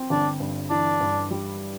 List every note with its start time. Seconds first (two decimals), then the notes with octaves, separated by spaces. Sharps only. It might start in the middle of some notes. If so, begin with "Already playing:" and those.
Already playing: C4
0.10 G1 D4
0.40 G2
0.70 E3 D4
1.01 G2
1.30 G3